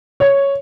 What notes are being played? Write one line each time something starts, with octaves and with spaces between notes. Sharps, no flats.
C#5